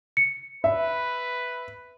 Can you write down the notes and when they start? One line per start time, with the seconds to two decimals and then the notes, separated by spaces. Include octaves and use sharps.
0.17 C#7
0.64 B4 E5